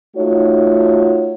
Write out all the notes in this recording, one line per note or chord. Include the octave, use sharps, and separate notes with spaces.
A3 D#4 F4 F#4 C#5